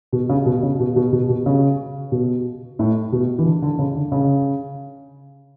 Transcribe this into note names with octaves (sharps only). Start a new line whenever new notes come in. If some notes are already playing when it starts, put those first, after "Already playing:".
B2
C#3
B2
C#3
B2
B2
B2
B2
C#3
B2
A2
B2
E3
D3
D3
C#3
D3
C#3